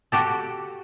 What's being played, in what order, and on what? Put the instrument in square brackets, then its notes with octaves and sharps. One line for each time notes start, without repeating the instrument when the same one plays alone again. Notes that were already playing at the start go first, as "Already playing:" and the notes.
[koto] F#4 G4 A4